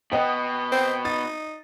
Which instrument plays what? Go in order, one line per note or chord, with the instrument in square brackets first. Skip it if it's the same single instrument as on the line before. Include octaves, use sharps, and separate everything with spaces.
[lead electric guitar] B2 B3 [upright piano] D#5 G5
[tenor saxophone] C4
[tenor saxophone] D#4 [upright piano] A6